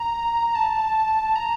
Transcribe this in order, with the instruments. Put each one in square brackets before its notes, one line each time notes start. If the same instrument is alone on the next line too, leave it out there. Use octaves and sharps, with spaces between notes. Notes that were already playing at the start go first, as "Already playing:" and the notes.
Already playing: [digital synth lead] A#5
A5
A#5